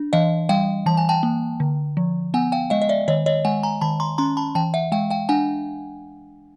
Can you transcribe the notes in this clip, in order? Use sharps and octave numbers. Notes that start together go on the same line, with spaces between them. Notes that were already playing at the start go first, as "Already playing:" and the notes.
Already playing: D4
E3 D#5 F5
G3 F5 G5
E3 A5
G#5
G5 A5
A#3
D3
F3
B3 F#5 G#5
F5 G5
G#3 D#5 F5
D#5
D5 E5
D#3 C#5 D#5
C#5 D#5
G#3 F#5 G#5
G#5 A#5
D#3 A5 B5
A#5 C6
C#4 A#5 C6
A5 B5
E3 G5 A5
E5 F#5
G#3 F5 G5
F5 G5
D4 F#5 G#5